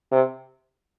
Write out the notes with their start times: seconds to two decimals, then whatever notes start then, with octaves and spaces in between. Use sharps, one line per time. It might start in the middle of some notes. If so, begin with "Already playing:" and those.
0.12 C3